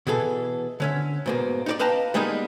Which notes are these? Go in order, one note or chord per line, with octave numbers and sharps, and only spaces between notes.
B2 E3 G#4 A4
D3 C#4 E5
G#2 B2 A#3
D#4 F#4 D5
B4 D#5 F5 G5 A5 A#5
G3 G#3 A#3 B3 D#4